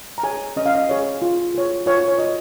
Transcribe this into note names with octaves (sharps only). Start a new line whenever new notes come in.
A#5
G#4 C#5 G#5
C#4 D#5
F5
D#5
G#4 C#5
F4
G#4 C#5
F4 C#5
C#5
G#4 C#5 D#5